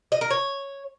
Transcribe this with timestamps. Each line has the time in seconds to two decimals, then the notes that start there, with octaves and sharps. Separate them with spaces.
0.12 D#5
0.21 A#4
0.31 C#5